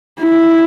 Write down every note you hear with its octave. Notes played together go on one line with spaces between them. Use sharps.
E4